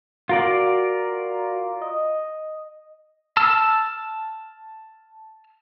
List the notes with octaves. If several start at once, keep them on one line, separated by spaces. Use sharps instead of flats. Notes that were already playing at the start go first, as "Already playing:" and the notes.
F4 F#4 A#4 D5
D#5
A5 E6 F6